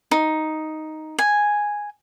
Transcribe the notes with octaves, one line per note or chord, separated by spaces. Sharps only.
D#4
G#5